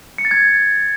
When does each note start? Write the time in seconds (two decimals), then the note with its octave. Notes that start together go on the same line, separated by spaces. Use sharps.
0.18 C#7
0.25 A6
0.31 G#6